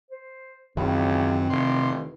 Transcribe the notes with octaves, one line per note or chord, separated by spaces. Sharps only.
C5
C#2 F#2 D#3 E3 C4
F1 C3 C6